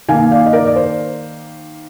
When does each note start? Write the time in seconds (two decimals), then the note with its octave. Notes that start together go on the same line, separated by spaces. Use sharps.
0.08 D#3 A#3 F5 G#5
0.31 D5 F5
0.46 D#5
0.53 A#4 D5
0.67 D5
0.76 C5